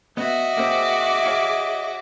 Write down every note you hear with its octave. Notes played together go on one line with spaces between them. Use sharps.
B3 F#4 D#5 E5
A#3 C4 G#4 D6
C#5 F5